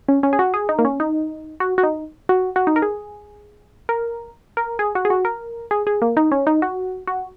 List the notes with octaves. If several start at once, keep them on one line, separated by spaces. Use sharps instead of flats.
C#4
C#4
G#4
F#4
G#4
D#4
A#3
C#4
D#4
F#4
F#4
D#4
F#4
F#4
D#4
A#4
G#4
A#4
A#4
G#4
F#4
G#4
F#4
A#4
G#4
G#4
A#3
D#4
C#4
D#4
F#4
F#4